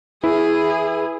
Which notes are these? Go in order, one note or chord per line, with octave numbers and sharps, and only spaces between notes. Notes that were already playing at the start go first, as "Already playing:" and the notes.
E3 E4 G#4